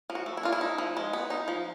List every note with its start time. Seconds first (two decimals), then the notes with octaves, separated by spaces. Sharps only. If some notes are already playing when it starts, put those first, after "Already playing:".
0.10 F3
0.15 F#4
0.26 A3
0.37 E4
0.43 D4 F4
0.52 E4
0.61 D#4
0.78 F3
0.97 G#3
1.13 B3
1.30 D#4
1.48 F3